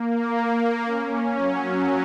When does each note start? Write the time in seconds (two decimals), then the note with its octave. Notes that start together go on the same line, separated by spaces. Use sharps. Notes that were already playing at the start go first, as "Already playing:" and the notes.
Already playing: A#3
0.85 C#4
1.36 F#3